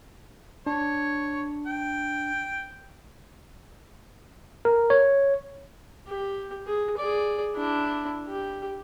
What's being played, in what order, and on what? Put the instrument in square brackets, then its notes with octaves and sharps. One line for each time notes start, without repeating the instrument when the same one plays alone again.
[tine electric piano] D4 [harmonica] C#5
[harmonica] G5
[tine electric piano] A#4
C#5
[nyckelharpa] G4
G#4
G#4 D5
D4 E4
G4